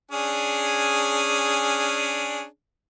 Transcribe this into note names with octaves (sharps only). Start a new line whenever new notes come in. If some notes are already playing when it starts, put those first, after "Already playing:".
C#4 D4 G#4